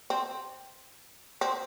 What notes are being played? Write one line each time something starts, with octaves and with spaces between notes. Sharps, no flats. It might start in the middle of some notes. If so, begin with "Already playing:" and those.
C4
C4